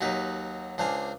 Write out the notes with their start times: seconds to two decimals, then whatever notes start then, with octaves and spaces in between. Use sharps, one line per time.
0.01 D#2 F#3 D#4 B4
0.78 C#2 D4 C5 F5 G#5